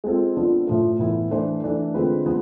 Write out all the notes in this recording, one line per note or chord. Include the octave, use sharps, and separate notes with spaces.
G#3 C4 F4 A4
F3 B3 D4 F4
A2 F3 A3
A2 E3 B3 E4
E3 A3 D4 A4 C5
E3 A3 D4 A4
D3 G#3 C4 F4 B4
F3 G#3 B3